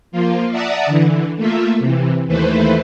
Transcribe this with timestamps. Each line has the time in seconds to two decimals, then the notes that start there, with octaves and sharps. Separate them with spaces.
0.12 F3 A#3 F4
0.50 D5 E5 F#5 A5 A#5 D#6
0.86 D3 E3
1.37 A3 A#3 F4 E5
1.79 C3 E3
2.27 D#2 E3 A3 B4 C5